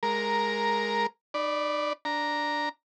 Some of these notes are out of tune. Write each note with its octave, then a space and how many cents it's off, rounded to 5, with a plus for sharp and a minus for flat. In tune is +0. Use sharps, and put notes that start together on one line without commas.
G#3 +0 A#4 +5 A#5 +0
D#4 -35 D5 +0 B5 +0
D4 +0 A#5 +0